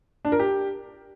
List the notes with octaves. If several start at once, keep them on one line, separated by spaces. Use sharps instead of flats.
D4
A#4
G4